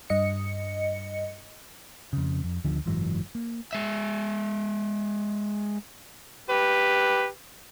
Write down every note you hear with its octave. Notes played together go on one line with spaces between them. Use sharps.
G2 D#5 C#7
F2 C#3
F2
D2 D3 D#3 F3
F#1 G#2 E3 F#3
A#3
G#3 E5
G4 B4